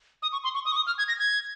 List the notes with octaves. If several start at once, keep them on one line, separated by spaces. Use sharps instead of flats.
D#6
C#6
C6
C#6
D#6
C#6
D#6
F6
G#6
A#6
G#6